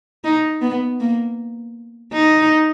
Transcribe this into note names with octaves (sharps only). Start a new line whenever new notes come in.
D#4
B3
A#3
D#4